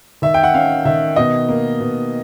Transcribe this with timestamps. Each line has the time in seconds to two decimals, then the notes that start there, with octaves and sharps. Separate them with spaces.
0.22 D#3 E5
0.34 G5
0.43 F#5
0.54 C#4 F5
0.85 D#3 E5
1.16 B2 D#5
1.49 A#3
1.80 B2